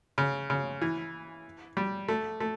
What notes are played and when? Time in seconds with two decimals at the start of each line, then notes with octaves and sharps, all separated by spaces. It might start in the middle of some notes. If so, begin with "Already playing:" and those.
0.18 C#3
0.50 C#3
0.82 E3
1.77 G3
2.08 A3
2.40 A3